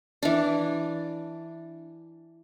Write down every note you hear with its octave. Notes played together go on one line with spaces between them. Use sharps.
E3 D4